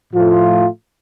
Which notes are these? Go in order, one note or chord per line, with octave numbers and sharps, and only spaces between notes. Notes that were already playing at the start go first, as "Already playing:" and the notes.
A2 F3 A3 F4